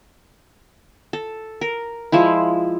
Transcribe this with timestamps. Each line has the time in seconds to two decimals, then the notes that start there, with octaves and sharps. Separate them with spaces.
1.13 A4
1.61 A#4
2.12 F3 G#3 E4